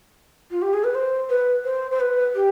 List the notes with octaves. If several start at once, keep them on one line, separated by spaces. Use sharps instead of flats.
F4
G4
G#4
B4
C5
B4
C5
C5
B4
G4